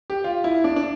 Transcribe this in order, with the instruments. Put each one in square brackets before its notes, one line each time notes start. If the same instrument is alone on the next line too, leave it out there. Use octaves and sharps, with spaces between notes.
[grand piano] G4
F4
E4
D4
D4